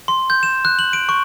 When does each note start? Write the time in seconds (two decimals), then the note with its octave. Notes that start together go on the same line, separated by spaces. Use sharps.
0.08 C6
0.30 G6
0.43 E7
0.65 F#6
0.79 F#7
0.93 D7
1.09 C#6